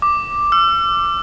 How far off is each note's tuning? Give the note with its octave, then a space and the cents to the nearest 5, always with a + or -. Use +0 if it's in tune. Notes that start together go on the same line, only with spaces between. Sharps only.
D6 +0
E6 +45